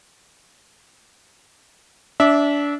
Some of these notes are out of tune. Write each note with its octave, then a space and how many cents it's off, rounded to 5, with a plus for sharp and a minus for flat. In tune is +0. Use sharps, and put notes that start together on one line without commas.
D4 -25 E5 -15 D6 +0